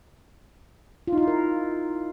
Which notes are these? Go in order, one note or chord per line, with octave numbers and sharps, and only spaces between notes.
F4
D#4
F4
E4
A#4